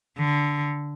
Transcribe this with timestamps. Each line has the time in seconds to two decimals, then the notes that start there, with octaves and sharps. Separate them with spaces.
0.18 D3